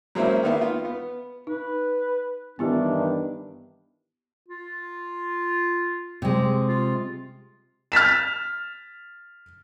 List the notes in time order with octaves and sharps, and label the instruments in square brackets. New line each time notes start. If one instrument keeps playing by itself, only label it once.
[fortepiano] F#3 G#3 A#3 C4 C#4 E4
D#3 A#3 B3 E4
F4
B3
[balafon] D#4 [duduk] B4
[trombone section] G2 D#3 E3 [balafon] B3 E4 G4 [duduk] D4
[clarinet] F4
[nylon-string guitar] C3 G#3
[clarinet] F4
[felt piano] F6 A6 B6 E7